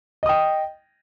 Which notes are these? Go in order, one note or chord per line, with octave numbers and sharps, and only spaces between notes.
D#5 G5 D#6